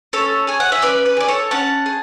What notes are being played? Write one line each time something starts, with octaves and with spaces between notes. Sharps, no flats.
C#4 A4 C#5
G#4 G#5
F#5
E5
C#4 B4 D5
B4
G#4 D5
A4 C#5
C#4 F#5 A5
G#4